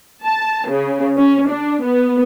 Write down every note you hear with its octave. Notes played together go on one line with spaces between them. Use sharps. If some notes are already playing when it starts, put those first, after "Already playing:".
A5
C#3
C#4
D4
B3